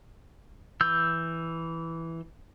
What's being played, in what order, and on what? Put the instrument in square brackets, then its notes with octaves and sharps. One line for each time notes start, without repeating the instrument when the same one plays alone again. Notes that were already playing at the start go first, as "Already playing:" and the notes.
[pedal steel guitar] E3 E6 G6